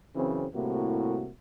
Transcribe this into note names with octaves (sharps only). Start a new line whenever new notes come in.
F#2 C#3 E3 C4
C2 A2 C3 A#3 E4 F#4